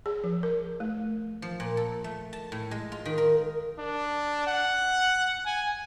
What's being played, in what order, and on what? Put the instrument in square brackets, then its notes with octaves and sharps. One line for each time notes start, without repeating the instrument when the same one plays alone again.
[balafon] G#4
F3
A#4
A3
[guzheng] F3
A#2
A4
A3
A5
A2
G#3
F4
D#3
A#4
[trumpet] D4
F#5
G#5